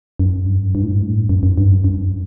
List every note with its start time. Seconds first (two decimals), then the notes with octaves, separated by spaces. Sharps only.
0.19 F#2
0.46 G2
0.75 G2
0.83 A2
0.88 G2
1.02 A2
1.29 F#2
1.43 F#2
1.58 G2
1.71 F#2
1.84 F#2